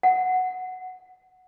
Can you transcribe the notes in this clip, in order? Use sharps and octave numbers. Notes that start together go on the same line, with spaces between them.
F#5